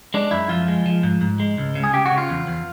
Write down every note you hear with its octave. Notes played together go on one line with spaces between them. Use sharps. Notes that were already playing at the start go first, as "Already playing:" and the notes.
G#3 D4
F#2 E4
F3 F4
G#3
F3
G#2
G#2
G#3
C#2
C#3
G#4
C#3 G4
F#4
C#3
F4
E2
E2